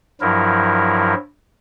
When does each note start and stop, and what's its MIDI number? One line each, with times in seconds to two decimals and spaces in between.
0.21 1.14 43
0.21 1.14 53
0.21 1.14 54
0.21 1.14 64
0.21 1.14 70